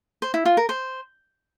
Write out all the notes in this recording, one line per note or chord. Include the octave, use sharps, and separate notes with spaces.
C5
E4
F4
A#4
C5